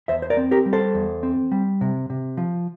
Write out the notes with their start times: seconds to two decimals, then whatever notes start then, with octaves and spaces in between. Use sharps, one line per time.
0.08 E2 C5 E5
0.22 C5
0.30 A#4 D5
0.37 C4
0.51 G4 A#4
0.66 G3
0.73 A4 C5
0.94 E2
1.23 C4
1.52 G3
1.81 C3
2.10 C3
2.37 F3